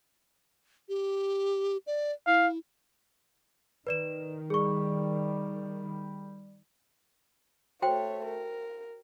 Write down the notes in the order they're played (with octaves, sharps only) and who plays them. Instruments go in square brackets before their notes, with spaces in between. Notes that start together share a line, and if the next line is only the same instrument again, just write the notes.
[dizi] G4
D5
[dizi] E4 [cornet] F5
[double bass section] D#3 [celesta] B4 D5 E7
[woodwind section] G3 [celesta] G#4 C#6
[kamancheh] A3 C#5 [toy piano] F#4 C5 G5
[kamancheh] A#4